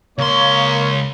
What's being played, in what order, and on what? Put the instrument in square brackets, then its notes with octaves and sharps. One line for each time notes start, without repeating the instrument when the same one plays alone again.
[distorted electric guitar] C#2 C6 [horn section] A#3 C#5